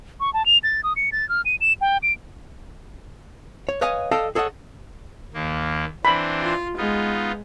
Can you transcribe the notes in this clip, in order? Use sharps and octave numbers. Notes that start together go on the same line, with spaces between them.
C#6
A5
F7
A6
D#6
C#7
A6
F6
D#7
E7
G5
D7
C#5
B4 C#5 D#5 F5 G#5
A4 D5 D#5 F5 G5 A5
G#4 A4 C#5 D#5 F#5
D#2 A#3
E3 C4 D4 B5
F4
G#3 B3 D#4 F4